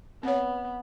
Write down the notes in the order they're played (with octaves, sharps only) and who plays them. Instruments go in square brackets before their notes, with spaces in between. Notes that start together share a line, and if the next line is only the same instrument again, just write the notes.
[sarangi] B3 [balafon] C4 C#5